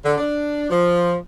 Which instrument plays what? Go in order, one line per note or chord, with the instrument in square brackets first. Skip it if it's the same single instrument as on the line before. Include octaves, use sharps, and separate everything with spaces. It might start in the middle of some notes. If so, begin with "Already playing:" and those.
[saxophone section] D3
D4
F3